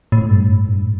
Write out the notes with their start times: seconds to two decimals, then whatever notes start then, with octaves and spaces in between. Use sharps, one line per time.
0.12 A2
0.31 G2
0.50 A2
0.68 G2